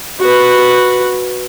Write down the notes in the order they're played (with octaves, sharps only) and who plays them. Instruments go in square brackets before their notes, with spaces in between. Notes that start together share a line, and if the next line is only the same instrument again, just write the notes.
[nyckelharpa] F#4 B4